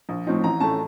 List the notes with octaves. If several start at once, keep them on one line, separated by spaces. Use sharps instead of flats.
A#1
A2 F3 C4 D#4
A1 A#5
A2 A3 C#4 A5